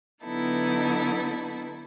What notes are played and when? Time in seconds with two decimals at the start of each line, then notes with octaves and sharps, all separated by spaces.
0.24 D3 F#3 B3 D#4 E4 A4